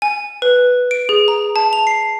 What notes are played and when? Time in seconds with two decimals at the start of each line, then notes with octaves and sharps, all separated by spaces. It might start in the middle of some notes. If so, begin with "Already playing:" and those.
0.02 G#5
0.42 B4
0.91 D7
1.09 G#4
1.28 A#5
1.56 A5
1.73 F7
1.87 C7